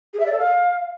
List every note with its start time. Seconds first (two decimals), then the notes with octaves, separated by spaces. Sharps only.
0.13 G#4
0.20 E5
0.26 D5
0.32 A4
0.38 F5